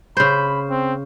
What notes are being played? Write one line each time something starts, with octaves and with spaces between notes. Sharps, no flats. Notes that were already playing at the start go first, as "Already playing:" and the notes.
C#3 C5 B5
C4